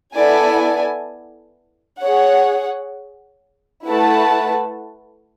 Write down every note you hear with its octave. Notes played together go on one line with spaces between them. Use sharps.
B3 E4 A4 D5 G#5
G#4 C#5 F#5
A3 E4 B4 F#5 A5